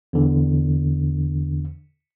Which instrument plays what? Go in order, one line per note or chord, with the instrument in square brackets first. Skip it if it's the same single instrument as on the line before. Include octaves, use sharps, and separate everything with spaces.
[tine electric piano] E2 D3